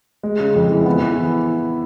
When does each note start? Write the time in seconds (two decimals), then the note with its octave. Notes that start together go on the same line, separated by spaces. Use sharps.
0.23 G#3
0.40 C#3
0.55 F2
0.71 E3
0.86 B3
1.02 E3